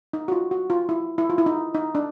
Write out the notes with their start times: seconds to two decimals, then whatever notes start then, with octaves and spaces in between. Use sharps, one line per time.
0.13 D#4
0.28 F#4
0.32 F4
0.51 F#4
0.70 F4
0.89 E4
1.18 E4
1.30 F4
1.38 E4
1.46 D#4
1.74 D#4
1.95 D4